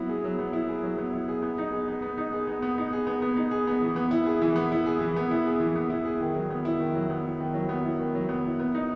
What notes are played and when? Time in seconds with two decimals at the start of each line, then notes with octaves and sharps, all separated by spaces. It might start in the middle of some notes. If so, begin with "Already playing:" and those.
Already playing: F#3 B3 E4
0.09 G#4
0.24 F#3
0.39 B3
0.53 E4
0.69 G#4
0.83 F#3
0.98 B3
1.13 E4
1.28 G#4
1.42 B3
1.58 D#4
1.73 G#4
1.88 B3
2.02 B3
2.18 D#4
2.32 G#4
2.47 B3
2.62 B3
2.78 D#4
2.93 G#4
3.07 B3
3.22 B3
3.36 D#4
3.51 G#4
3.67 B3
3.82 E3
3.96 B3
4.11 E4
4.26 G#4
4.42 E3
4.56 B3
4.72 E4
4.86 G#4
5.01 E3
5.16 B3
5.31 E4
5.46 G#4
5.60 E3
5.75 B3
5.90 E4
6.05 G#4
6.20 D#3
6.35 F#3
6.50 B3
6.65 E4
6.80 D#3
6.95 F#3
7.10 B3
7.25 E4
7.40 D#3
7.54 F#3
7.69 B3
7.84 E4
7.99 D#3
8.15 F#3
8.29 B3
8.45 E4
8.59 B3
8.75 D#4